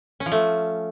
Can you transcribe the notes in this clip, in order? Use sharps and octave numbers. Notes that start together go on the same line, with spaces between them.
C#4
F3
A3